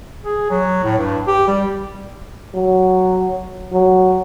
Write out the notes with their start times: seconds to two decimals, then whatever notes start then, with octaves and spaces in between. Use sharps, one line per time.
0.24 G#4
0.50 F#3
0.84 A2
0.98 G2
1.27 G4
1.48 G3
2.55 F#3
3.72 F#3